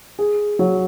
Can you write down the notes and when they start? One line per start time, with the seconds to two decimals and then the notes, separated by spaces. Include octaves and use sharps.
0.19 G#4
0.59 F#3